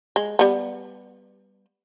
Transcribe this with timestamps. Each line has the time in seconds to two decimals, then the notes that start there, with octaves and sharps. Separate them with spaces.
0.16 G#3
0.39 G3 B3